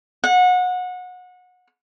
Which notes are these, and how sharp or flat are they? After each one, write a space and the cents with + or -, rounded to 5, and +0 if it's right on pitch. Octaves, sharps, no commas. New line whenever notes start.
F#5 -25